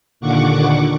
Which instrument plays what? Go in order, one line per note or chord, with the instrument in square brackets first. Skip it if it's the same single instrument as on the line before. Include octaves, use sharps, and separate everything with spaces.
[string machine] D#2 A#2 D3 F#5 C#6 D6